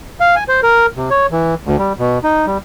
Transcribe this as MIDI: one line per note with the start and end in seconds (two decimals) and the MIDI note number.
0.20 0.35 77
0.36 0.44 80
0.48 0.60 72
0.63 0.86 70
0.96 1.09 48
1.10 1.26 73
1.31 1.54 52
1.65 1.77 38
1.79 1.93 55
1.99 2.19 47
2.24 2.46 63
2.46 2.58 55